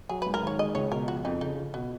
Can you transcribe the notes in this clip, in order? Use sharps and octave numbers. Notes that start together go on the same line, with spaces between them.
F#3 G#4
G#2 B4
A#4
D#3 C#5
G#3 D#5
C#2 C#5
B2 A#4
F3 F#4
F2 D#4
C#3 D#4
F4
B2 B3